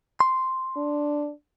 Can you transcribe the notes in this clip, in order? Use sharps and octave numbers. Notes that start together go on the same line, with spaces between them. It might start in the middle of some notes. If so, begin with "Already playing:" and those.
C6
D4